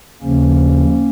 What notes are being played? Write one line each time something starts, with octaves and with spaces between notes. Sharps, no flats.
D#2 C#3 F3 A#3 C#4